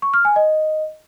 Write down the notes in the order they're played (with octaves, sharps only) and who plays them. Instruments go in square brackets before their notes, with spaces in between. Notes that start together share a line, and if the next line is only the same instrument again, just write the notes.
[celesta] C#6
F6
G#5
D#5